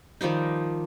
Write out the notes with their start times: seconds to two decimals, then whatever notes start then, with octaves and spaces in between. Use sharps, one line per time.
0.21 D#3 F3 G3 D#4